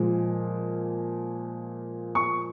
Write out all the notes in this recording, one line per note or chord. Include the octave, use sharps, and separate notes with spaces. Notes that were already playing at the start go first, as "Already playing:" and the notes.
Already playing: A#2 F3 G#3
C#6